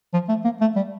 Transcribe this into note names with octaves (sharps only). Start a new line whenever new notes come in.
F3
A3
A#3
A3
G3